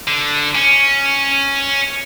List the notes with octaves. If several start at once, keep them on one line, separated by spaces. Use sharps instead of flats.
D3
C#4